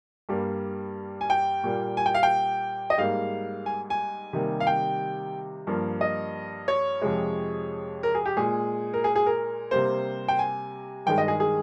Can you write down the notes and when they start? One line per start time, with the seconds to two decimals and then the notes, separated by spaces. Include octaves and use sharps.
0.29 G2 G3 A#3
1.21 G#5
1.30 G5
1.64 A#2 G3 A#3
1.97 G#5
2.06 G5
2.14 F5
2.23 G5
2.90 D#5
2.98 G#2 G3 A#3 F5
3.66 G#5
3.90 G#5
4.33 C3 D#3 G3 A#3
4.60 F5
4.67 G5
5.67 G2 F3 A#3
6.01 D#5
6.68 C#5
7.02 F2 C3 F3 G#3
8.03 A#4
8.15 G#4
8.26 G4
8.37 A#2 G#3 G#4
8.94 A#4
9.04 G#4
9.16 G#4
9.26 A#4
9.71 C3 G3 A#3 C5
10.28 G5
10.39 G#5
11.06 G2 D#3 G#3 G5
11.18 D#5
11.28 G#4
11.40 G#4